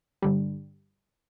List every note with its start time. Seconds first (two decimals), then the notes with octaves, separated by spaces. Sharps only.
0.22 G2 D3 G3